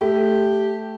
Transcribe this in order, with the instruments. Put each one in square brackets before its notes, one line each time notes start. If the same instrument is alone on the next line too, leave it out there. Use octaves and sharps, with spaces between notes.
[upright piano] A3 [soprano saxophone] G4